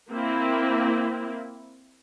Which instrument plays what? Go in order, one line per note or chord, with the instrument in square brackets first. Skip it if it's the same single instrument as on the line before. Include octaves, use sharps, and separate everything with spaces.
[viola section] A#3 C4 E4